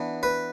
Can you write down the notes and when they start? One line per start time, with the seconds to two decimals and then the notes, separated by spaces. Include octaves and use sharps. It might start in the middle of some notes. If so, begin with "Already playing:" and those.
Already playing: E3 B3 D4
0.23 B4